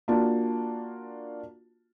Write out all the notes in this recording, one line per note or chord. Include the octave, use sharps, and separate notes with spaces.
A#3 D4 F4 F#4 A5